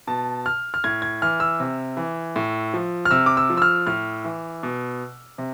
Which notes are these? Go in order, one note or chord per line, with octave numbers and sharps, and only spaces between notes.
B2 A5
F6
F6
A2 G#6
G#6
E3 F6
E6
C3
E3
A2
F3
F6
C3 E6
D6
E6
F3
E6
F6
A2 F6
E3
B2
C3